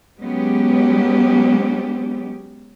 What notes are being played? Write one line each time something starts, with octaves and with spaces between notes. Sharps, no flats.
F#3 G#3 B3 C#4 G4